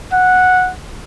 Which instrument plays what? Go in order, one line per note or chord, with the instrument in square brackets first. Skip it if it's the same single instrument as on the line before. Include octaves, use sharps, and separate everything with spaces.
[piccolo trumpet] F#5